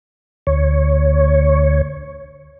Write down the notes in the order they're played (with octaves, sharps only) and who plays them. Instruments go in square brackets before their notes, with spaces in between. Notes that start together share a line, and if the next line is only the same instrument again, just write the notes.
[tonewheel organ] D2 C#5